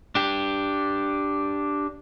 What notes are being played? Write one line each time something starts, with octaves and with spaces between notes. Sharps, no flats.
D4 G4